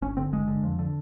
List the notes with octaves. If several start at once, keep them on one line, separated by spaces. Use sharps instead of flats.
G1 C#4
D3 C4
G1 G#3
D3
F2
D3